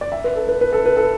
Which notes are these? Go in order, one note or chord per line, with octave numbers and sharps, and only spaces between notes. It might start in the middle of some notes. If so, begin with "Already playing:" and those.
D5
E5
B4
A4
B4
B4
A4
B4
A4